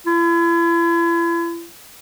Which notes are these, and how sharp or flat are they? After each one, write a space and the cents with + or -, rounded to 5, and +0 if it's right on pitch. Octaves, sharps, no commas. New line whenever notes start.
E4 +40